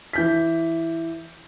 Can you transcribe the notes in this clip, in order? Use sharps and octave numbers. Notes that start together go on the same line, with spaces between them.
E3 G6 B6